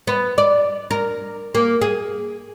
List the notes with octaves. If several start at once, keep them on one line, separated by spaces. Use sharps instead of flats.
B3
D5
A#4
A#3
G#4